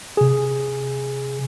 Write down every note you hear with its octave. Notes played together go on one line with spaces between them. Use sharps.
C3 G#4